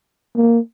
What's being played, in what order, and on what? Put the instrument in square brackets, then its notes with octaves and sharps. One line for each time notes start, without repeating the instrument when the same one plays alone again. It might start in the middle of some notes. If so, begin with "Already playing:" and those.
[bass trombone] A#3